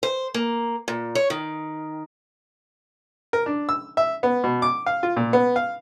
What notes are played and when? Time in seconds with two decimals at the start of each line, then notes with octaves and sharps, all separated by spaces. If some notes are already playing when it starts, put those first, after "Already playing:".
0.03 C5
0.34 A#3
0.88 A#2
1.15 C#5
1.30 D#3
3.33 A#4
3.46 D4
3.69 E6
3.97 E5
4.23 B3
4.44 B2
4.62 D6
4.86 F5
5.03 F4
5.17 A#2
5.33 B3
5.56 F5